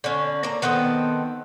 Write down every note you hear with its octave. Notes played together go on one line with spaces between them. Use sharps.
D3 C#4
A#3 A#5
D#3 B3 C4 A4